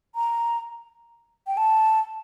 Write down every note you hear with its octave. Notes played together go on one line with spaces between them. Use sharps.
A#5
G5
A5